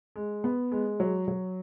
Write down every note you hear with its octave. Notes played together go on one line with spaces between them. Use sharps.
G#3
B3
G#3
F#3
F#3